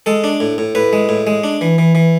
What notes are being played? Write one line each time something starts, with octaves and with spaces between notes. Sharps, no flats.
G#3 A4
D4
A2
A2
A2 B4
G#3
A2
G#3
D4
E3
E3
E3